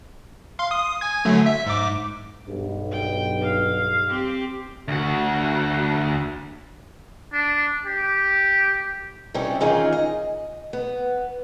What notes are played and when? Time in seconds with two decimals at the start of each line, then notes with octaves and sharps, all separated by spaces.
0.59 F5 C6
0.71 D#6
1.01 G#5 G#6
1.25 D3 F#3 A3
1.46 E5
1.67 G#2 D6
2.47 B1 G2
2.91 G5
3.41 F5
4.09 C4 G4
4.88 D2 F#4
7.33 D4
7.86 G4
9.34 C3 G3 C#4 D#4 E4 G4
9.61 D#3 E3 C#4 D#4 F4 G#4
9.93 D#5
10.73 B3